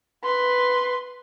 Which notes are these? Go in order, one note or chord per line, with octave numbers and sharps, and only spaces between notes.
B4 C6